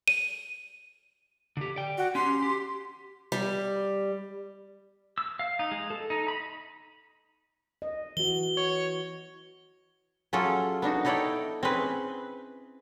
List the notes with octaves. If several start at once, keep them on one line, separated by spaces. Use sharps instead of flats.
D#7
D3 G4
D5 G5
F#4
C#4 G4 C6
G4
G3
E6
F5
D#4
G#3
A4
D#4
B5
D#5
E3 F#4 G7
C#5
F#3 C#4 F4 G#4 A4
B3 D4 D#4 F#4
D#4 E4 A4 C#5 D5 G5
C4 C#4 G#4 B4